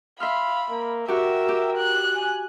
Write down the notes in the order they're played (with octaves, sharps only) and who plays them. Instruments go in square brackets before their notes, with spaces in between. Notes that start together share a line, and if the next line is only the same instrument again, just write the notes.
[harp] E5 C6 F6 [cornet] F5 [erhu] B5
[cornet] A#3
[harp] F#4 G4 [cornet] A#4 [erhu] E5
[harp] G4
[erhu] F#6
[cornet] G#5